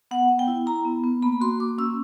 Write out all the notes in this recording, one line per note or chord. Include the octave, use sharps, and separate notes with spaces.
B3 F#5
B3
G5
E4
E4 A#5
B3
B3
A#3 B5
F#4 C6
A#3 D6
C#4 E6